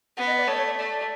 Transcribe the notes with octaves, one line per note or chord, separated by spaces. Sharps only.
B3 F#5
D#5
D5
A3 C#5
C#5
D5
A3 D5
D5